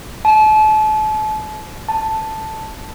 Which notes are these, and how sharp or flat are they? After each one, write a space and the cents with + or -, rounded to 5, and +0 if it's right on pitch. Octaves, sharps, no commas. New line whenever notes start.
A5 -35
A5 +0